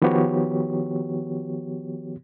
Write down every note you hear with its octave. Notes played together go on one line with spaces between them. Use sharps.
D#3 F3 B3 F#4 G4 C#5